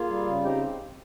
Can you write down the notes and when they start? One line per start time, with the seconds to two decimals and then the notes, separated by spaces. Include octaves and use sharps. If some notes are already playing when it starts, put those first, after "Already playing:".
Already playing: A#3 F4 G#4
0.09 G3
0.26 C#3
0.43 C4 D#4 G4